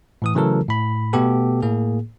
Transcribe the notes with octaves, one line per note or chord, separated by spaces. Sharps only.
A2 E3 D#6
C#3 E3 F#3 A3 A4 A#4
A2 B5
B2 A3 B3 G4 A4
A2 A#3 G#4